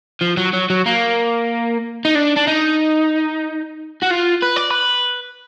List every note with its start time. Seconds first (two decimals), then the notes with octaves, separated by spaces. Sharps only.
0.21 F3
0.37 F#3
0.54 F#3
0.70 F#3
0.86 A#3
2.05 D#4
2.15 D4
2.37 D4
2.48 D#4
4.02 F#4
4.10 F4
4.43 B4
4.57 D5
4.71 B4